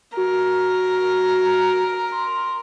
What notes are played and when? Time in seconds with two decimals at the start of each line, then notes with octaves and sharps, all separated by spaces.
0.17 F#4 A#4
2.12 C6